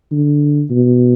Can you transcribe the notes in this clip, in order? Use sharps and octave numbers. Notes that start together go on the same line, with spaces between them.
D3
B2